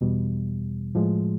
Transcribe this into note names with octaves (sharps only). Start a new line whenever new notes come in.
E2 B2 G3
A2 F3 G#3